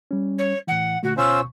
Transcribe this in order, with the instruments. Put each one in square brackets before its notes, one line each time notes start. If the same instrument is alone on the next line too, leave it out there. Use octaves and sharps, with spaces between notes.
[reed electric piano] G3 C#4
[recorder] C#5
[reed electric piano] A2 E3 [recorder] F#5
[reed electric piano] A#2 D3 A3 [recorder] F#4
[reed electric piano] D2 B2 C#6 [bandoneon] C#4 F4 C5 [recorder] E6